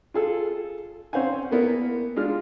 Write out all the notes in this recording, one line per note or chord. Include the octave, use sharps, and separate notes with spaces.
F4 G#4 A4
C4 C#4 C5 F5 F#5 G#5
A#3 B3 E4 A#4
G#3 D4 F4 F6